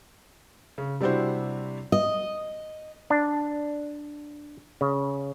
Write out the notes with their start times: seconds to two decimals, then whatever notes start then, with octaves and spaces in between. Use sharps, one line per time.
0.78 C#3
1.01 C3 G3 D4 E4 F#4 C5
1.92 D#5
3.10 D4
4.81 C#3